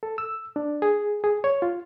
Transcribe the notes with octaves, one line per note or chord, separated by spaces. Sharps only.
A4
E6
D4
G#4
G#4
C#5
F4